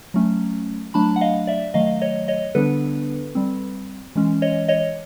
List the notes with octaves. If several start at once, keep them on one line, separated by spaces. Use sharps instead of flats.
F#3 A3 C#4
F#3 A3 D4 A5 B5
F#5
D#5 F5
D5 E5
D#3 F#3 A3 D#5 F5
C#5 D#5
C#5 D#5
D3 G3 B3 D4 A4 B4
G3 C4
E3 G#3 C#4
C#5 D#5
C#5 D#5